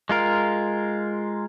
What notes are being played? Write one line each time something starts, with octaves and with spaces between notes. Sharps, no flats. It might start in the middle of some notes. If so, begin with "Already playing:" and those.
G#3 F4 A#4